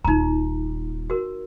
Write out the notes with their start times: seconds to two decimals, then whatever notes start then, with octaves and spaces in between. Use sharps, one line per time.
0.05 D#1 D#4 F4 A#5
1.10 F#4 A#4